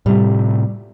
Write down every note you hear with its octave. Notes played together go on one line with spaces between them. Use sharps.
A2 C3 G3